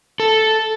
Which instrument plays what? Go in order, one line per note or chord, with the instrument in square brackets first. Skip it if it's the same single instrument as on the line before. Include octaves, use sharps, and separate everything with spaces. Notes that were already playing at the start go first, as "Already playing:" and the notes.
[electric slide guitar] A4